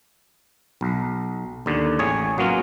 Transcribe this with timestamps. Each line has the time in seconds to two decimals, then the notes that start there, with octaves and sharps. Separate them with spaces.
0.81 B1
1.66 D#2 D3
1.99 A1 G#4 C#5
2.38 F#3 A#3 B3 C#4 F4 F#4